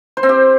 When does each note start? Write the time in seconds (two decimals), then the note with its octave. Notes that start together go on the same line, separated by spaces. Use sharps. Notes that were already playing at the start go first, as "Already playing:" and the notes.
0.17 C5
0.23 C4
0.29 G4